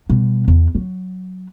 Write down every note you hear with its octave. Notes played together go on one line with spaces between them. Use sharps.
B2 G3
E2
F#3